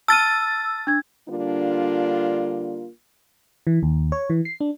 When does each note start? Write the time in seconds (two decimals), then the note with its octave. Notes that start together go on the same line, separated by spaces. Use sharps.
0.08 A5 E6 F6 A6 D#7
0.87 D4 G#6
1.29 D3 G3 A#3 D4 F4
3.67 E3
3.83 D#2
4.12 C#5
4.30 E3
4.45 C7
4.61 D4